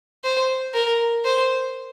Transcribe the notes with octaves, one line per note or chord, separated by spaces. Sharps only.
C5
A#4
C5